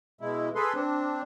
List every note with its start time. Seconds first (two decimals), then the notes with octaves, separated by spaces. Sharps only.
0.21 B2 G#3 E4
0.55 G#4 A4 B4 C6
0.74 C4 D4